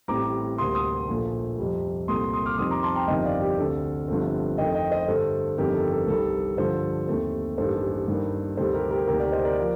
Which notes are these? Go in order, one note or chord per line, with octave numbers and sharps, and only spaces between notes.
A1 A2 G3 C4 A#5 D6
D2 C3 G3 A#3 C6 D#6
C6 D#6
A#1 A#2 F3 A3
F2 C3 G3
C2 A#2 A3 C4 C6 D#6
C6 D#6
D6 F6
F2 D#3 G3 C4 C6 D#6
A#5 D6
A5 C6
G5 A#5
G1 F2 C3 D#3 D#5 G5
D5 F5
G4
D2 D3 A3 C4 A4
G1 G2 F3 A3 C4
F2 D#3 A3 C4 D#5 G5
D#5 G5
C5 D#5
G2 D3 A3 A4 C5
G1 F2 D#3 A3 C4 G4 A#4
A4
A4
C2 C3 D#3 G3 A4
G2 D3 F3 A4 C5
D#2 D#3 A3 C4
A1 G2 D#3 A#3 A4 C5
G2 D#3 G3 A#3
D2 C3 D#3 G3 A4 C5
G4 A#4
G4 A#4
D2 C3 D#3 A#3 G4 A#4
A#4 D5
C5 D#5
A#4 D5
F3 A#3